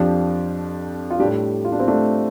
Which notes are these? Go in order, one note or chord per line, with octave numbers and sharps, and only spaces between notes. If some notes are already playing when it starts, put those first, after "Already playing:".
Already playing: F2 F3 D4 G4
F4
G3 D4 G4
A2
F4
D4
C4 F4
A3 D4